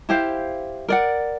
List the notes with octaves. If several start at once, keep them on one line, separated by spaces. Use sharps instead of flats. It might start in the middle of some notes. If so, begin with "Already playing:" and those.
E4 G4 C5 F5
A#4 D5 F#5